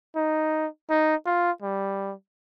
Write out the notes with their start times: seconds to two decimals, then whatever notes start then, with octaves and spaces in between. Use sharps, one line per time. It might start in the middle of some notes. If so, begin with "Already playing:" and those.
0.16 D#4
0.90 D#4
1.26 F4
1.62 G3